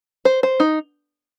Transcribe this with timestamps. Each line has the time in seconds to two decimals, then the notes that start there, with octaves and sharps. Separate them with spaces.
0.25 C5
0.43 C5
0.60 D#4